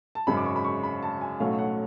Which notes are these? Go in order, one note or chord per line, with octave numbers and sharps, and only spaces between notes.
A5
G#1 F#2 C#3 G#3 B5
D6
C#6
B5
C#6
B5
A5
G#5
B1 A2 F#3 A3 C#4 F5
F#5